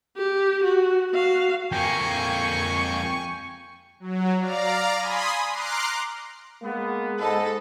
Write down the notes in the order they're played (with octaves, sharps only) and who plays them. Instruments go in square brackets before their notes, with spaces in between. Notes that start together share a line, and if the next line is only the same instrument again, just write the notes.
[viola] G4
F#4
F#4 F5
[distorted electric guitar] F2 A#3 [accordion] G5 [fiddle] G#5 C#6
[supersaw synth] F#3
D5 F5 A#5
G#5 B5 C6 D#6
A#5 C6 D6 F6 F#6 C7
[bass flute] G#3 [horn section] A#3 B3
[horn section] G#2 D#5 B5 [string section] A4